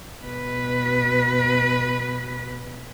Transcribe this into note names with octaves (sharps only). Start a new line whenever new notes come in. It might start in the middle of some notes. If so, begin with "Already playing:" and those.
B2 B4